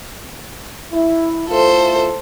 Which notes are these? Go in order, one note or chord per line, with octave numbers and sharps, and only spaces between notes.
E4
A3 E4 F4 A4 C5